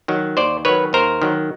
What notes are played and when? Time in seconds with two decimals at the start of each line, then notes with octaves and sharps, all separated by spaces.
0.08 D#3 F#3
0.37 D#2 C5 D5
0.65 D#3 F#3 B4 C#5
0.93 D#2 A#4 C5
1.22 D#3 F#3